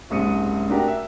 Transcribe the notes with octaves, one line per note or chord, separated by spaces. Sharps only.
F#1 C2 G#2 D#6 C#7 D#7
A3 D4 F#4 G4 A#4 F#5
E5